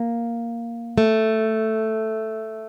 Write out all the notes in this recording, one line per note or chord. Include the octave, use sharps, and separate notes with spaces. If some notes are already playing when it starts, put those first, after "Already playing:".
Already playing: A#3
A3